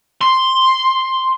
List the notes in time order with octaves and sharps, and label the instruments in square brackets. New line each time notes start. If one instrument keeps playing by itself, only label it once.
[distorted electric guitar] C6